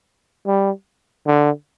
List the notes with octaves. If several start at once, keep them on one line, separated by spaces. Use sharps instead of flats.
G3
D3